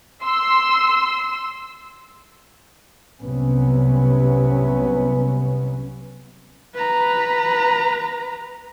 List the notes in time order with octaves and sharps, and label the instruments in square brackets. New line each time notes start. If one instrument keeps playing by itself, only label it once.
[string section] C6 E6
[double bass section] C2 C3 F#3 B3 C#4
[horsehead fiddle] B4 A#5